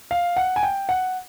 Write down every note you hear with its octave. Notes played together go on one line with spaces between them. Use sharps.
F5
F#5
G#5
G5
F#5